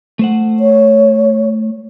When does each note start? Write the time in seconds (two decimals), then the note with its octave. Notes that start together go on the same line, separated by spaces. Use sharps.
0.19 A3 C5 F#5
0.60 C#5